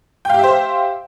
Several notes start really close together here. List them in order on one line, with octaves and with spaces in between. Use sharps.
G5 F5 G4 E5 C5